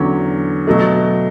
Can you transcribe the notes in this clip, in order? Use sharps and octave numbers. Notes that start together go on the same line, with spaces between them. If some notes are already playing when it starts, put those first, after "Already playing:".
Already playing: E2 D3 F#3 C#4
B2 F#3 A3